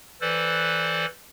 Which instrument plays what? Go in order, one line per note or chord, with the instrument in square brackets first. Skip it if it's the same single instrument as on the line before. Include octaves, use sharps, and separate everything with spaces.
[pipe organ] E3 A4 B4 C5 D5